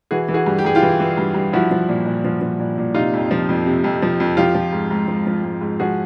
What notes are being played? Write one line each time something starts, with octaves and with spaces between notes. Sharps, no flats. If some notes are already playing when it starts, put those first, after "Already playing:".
E3 F#4 G#4
E3
F#4 G#4
G2
G4
G2 G#4
F4 G4
E3
E3
G2
G2
F3 E4 F#4
F3
A#2
A#2
F3
F3
A#2
A#2
C3 D#4 F4
F2
F3
F2
C3
F2
F3
F2
F3 F4 G4
F3
G#2
G#2
F3
F3
G#2
G#2
F3 F#4 G#4